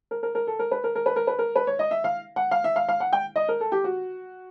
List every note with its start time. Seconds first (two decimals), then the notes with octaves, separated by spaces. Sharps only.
0.11 A#4
0.23 A#4
0.35 A#4
0.47 A4
0.59 A#4
0.71 B4
0.84 A#4
0.95 A#4
1.06 B4
1.16 A#4
1.27 B4
1.39 A#4
1.56 B4
1.67 C#5
1.79 D#5
1.91 E5
2.04 F5
2.36 F#5
2.51 F5
2.64 E5
2.76 F5
2.89 F5
3.00 F#5
3.13 G5
3.36 D#5
3.49 A#4
3.60 A4
3.72 G4
3.84 F#4